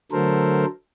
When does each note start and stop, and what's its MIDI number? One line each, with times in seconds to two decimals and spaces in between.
0.12 0.65 50
0.12 0.65 54
0.12 0.65 57
0.12 0.65 69
0.12 0.65 70
0.12 0.65 72